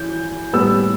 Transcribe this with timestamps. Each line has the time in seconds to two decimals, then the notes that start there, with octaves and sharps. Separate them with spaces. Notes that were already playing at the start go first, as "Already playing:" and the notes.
Already playing: E3 G6
0.53 A2 G3 B3 E6